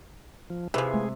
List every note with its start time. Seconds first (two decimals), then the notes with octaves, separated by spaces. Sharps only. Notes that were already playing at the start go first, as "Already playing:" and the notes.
0.50 F3
0.74 C3 E3 F3 G#4
0.94 G#3 A3